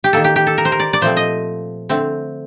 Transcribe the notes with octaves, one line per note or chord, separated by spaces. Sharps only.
G4
D#3 A#3 A4
G4
G4
A4
A#4
C5
A#4
D5
D5
A#2 F3 A3 C4 C5
D#5
D3 A3 C4